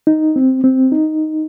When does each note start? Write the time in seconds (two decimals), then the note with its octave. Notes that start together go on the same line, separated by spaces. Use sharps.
0.07 D#4
0.36 C4
0.64 C4
0.92 D#4